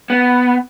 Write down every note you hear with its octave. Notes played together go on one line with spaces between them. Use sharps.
B3